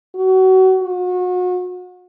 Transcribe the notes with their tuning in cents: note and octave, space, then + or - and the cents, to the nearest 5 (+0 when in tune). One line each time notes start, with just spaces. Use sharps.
F#4 +30
F#4 -35